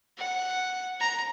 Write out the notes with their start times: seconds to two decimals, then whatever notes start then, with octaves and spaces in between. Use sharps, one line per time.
0.18 F#5
1.00 A#5